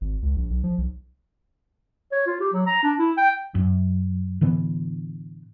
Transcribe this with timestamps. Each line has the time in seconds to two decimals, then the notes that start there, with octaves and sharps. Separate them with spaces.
0.01 G#1
0.22 C#2
0.36 A#1
0.50 B1
0.63 F3
0.78 B1
2.12 C#5
2.26 F4
2.40 G4
2.53 F#3
2.66 A#5
2.83 D4
2.99 E4
3.17 G5
3.55 F#2
4.41 A2 D3 E3 B3